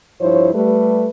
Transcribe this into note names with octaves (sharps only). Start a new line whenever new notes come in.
G2 F3 E4 C5 C#5
G3 A3 B4